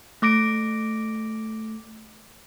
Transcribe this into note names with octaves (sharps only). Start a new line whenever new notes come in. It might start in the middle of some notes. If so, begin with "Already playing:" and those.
A3 D6 A#6 D7